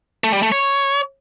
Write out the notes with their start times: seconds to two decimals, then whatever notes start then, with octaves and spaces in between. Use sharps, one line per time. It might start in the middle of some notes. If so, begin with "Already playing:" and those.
0.24 A3
0.33 G3
0.43 A3
0.52 C#5